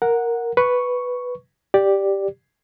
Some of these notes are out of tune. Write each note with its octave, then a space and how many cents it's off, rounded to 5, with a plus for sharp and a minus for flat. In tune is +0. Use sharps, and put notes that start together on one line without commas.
A#4 +0 F#5 -10
B4 +0 C#6 +0
G4 +0 D5 +0